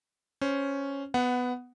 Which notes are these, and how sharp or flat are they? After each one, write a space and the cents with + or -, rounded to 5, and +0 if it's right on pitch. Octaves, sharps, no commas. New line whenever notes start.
C#4 +0 C5 +0
B3 +10 F#5 +0